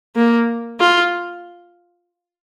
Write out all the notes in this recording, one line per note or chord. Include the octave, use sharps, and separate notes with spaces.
A#3
F4